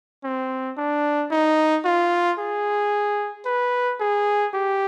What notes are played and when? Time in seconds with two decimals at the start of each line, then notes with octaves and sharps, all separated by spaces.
0.24 C4
0.77 D4
1.31 D#4
1.85 F4
2.39 G#4
3.46 B4
4.00 G#4
4.54 G4